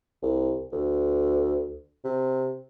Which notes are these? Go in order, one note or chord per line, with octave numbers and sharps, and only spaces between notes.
C2
D2
C3